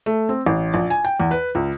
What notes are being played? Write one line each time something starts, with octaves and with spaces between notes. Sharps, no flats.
A3
C4
A1
A#1
G#5
G5
E2
B4
C#2